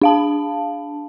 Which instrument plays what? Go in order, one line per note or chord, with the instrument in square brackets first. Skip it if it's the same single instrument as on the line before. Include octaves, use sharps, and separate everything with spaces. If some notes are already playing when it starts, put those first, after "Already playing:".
[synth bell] D4 F5 A5